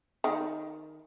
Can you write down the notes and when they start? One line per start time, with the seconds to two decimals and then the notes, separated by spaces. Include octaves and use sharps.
0.24 D#3